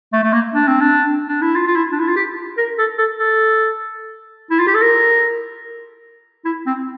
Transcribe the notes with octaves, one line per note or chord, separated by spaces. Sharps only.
A3
A3
A#3
D4
C4
D4
D4
E4
F4
F4
E4
D4
E4
F4
G4
A#4
A4
A4
A4
E4
F4
G4
A4
A#4
E4
C4